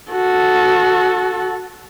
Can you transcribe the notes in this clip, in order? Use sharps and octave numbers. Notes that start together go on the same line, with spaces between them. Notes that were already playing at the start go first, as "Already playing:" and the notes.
F#4 A4